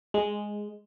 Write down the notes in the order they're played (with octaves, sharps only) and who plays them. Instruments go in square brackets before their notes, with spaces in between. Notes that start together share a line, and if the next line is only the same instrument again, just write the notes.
[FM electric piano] G#3